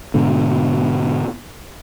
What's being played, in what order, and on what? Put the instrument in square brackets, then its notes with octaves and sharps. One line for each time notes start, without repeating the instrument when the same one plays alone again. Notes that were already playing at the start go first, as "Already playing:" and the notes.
[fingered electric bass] G#2 B2 D3